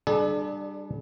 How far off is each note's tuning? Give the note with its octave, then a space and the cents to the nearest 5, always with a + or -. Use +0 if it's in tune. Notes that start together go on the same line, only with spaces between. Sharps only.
G3 +0 D4 +25 G#4 +45